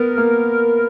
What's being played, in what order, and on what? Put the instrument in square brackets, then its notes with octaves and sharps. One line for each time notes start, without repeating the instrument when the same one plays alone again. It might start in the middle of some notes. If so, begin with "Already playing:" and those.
Already playing: [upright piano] B3 [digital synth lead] A#4
[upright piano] A#3